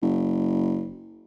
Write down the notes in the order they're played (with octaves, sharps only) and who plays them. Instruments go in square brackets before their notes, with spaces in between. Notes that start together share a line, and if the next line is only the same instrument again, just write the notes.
[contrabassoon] F#1